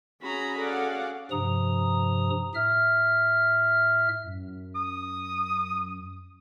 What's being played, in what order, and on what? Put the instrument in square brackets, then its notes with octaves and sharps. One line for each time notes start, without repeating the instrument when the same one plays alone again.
[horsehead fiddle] C#4 [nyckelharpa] F#4 G#4 [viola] A#5 B5
[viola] A4 [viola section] D5 F5 F#5
[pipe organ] G2 C3 F3 A#5 D#6
A2 E5 F6
[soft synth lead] F#2
[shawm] D#6